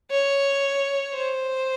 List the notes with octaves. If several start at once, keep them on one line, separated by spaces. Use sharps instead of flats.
C#5
C5